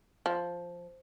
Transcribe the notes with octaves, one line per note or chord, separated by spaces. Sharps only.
F3